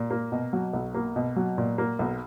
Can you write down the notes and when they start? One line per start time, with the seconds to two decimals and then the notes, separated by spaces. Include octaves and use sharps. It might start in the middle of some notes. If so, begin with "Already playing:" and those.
Already playing: A#2
0.11 A#3
0.32 B2
0.53 F#3
0.73 B1
0.95 A#3
1.16 B2
1.36 F#3
1.58 A#2
1.78 A#3
1.99 B1